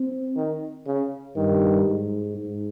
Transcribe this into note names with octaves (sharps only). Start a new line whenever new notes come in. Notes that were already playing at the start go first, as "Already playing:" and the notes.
Already playing: C4
D#3
C#3
G2 D#3
G#2
G#2